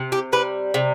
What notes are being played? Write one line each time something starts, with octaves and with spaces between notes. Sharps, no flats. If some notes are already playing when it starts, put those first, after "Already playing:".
Already playing: C3
G4
G3 B4
C3